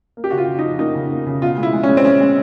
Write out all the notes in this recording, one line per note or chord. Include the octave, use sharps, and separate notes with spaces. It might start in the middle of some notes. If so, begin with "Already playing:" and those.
A#3
G4
C#3 F#4
F4
C#3
D#4
F3
A#3 D#4
C#3
A#3
C#3
B2 F4
G#3
E4
G#3
C#4
G#3
C4
G#3 C#4
G#3